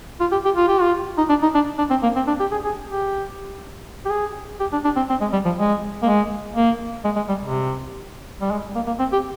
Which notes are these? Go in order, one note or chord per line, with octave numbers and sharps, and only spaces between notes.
F4
G4
G4
F4
G4
F4
D#4
D4
D#4
D4
D4
C4
A#3
C4
D4
G4
G#4
G#4
G4
G4
G#4
G4
D4
D4
C4
C4
G#3
G3
F3
G#3
A#3
G#3
A#3
G#3
G#3
G3
C3
G3
G#3
A#3
A#3
C4
G4